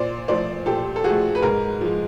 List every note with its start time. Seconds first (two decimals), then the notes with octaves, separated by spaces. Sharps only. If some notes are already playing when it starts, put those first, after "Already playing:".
Already playing: A#2 C5 D5
0.28 F3 A3 C5 D5
0.66 A#2 G4 A4
0.96 A4
1.04 F3 A3 F#4 G#4
1.35 B4
1.42 G#2 G#4 A#4
1.81 F3 G#3